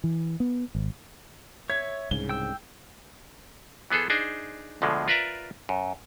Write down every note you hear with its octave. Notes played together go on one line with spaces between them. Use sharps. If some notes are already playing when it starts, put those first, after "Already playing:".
E3
B3
G#1
C#5 E5 G#6
C2 G#2 C#3 G7
G5 E6
E3 B3 G#4 A4 C5
D4 D#4 G#4 C5
D2 B2 D3 F3 G#3
F4 A#4 B4 D5 E5 A#5
F#2